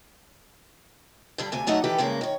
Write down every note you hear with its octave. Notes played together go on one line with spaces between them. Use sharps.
G2 D3 G3
D2 G2 C3 G#5
F#3 A3 D#4 D#5 F#5
D#3 E3 G4 A4 B4
G2 C#3 G#3 A#3 C#4 A#4
D#3 C#5